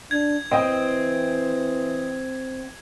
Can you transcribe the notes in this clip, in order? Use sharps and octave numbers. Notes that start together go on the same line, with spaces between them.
D4 G#6
E3 C4 D#5 G5